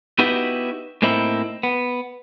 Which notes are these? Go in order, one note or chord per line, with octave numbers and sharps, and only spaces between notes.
B3 D#4 E4 F#4 G4 B4
A2 A#3 C4 D#4 E4
B3